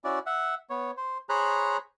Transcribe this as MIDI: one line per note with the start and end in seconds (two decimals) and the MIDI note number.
0.04 0.19 61
0.04 0.19 64
0.04 0.19 66
0.04 0.19 74
0.26 0.55 76
0.26 0.55 78
0.70 0.91 59
0.70 0.91 73
0.97 1.18 72
1.29 1.77 68
1.29 1.77 72
1.29 1.77 73
1.29 1.77 82
1.29 1.77 83
1.29 1.77 90